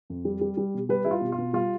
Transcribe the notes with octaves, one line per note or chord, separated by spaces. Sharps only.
F2
G3
G3
G3
B2
G3 B4
G3 E4
F4
B2
F4
B2
G3 F4